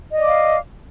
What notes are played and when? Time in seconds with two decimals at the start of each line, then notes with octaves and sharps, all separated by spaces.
0.12 D#5
0.17 D5
0.21 D6
0.26 F5